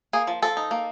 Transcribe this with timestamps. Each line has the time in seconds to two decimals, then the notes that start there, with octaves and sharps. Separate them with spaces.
0.13 A#3 G#4
0.27 F3
0.42 F3 A4
0.57 D#4
0.71 A#3